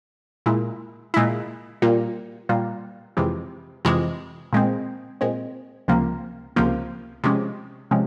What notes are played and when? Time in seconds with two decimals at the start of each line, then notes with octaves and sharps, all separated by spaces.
0.46 A#2 G#3 E4
1.14 A#2 G#3 E4
1.82 A#2 G3 A#3 F4
2.49 A#2 G3 A#3 F4
3.17 F2 C3 E3 G#3
3.85 F2 C3 E3 G#3
4.53 A#2 G#3 C4
5.21 A#2 G#3 C4
5.88 C#2 C3 F3 A#3
6.56 C#2 C3 F3 A#3
7.24 C3 F3 G#3 C#4
7.91 C3 F3 G#3 C#4